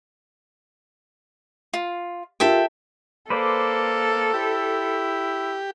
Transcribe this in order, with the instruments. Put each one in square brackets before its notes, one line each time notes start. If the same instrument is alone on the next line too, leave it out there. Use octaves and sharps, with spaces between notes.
[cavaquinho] F4
[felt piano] F4 G4 A#4 [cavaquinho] A4 E5 G5
[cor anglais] A#3 [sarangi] A4 [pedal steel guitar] B4 C5 D5
[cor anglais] E4 [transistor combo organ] G4